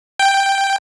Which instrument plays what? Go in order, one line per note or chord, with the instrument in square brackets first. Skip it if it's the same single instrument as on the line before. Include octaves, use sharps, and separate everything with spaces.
[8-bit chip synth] G5